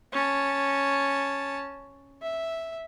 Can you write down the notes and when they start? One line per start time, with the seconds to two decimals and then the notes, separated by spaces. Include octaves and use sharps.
0.12 C#4 A5
2.22 E5